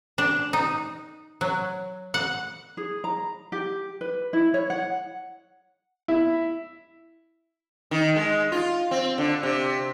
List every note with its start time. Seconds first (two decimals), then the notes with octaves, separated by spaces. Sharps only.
0.18 D4
0.53 D#4
1.41 F#3
2.14 F#5
2.77 G#4
3.04 A#5
3.52 G4
4.01 B4
4.33 E4
4.54 C#5
4.70 F#5
6.08 E4
7.91 D#3
8.16 G#3
8.52 F4
8.91 C4
9.18 D3
9.43 C3